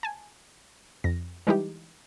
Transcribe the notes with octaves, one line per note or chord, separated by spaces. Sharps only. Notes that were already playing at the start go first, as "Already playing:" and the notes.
G#5 A5
F2 A#6
E3 G3 G#3 D#4 E4 G4